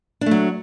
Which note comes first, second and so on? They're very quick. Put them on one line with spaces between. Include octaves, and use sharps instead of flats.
D4 A3 F#3